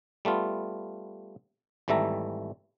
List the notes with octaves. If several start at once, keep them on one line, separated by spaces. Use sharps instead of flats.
G3 A3 B3 F4
G#1 E3 G3 A3 E5 A#5